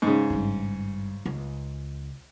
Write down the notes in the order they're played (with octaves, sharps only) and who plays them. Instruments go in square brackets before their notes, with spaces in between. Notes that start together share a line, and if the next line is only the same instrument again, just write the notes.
[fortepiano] G#2 C#3
[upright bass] G#1 G2
C#2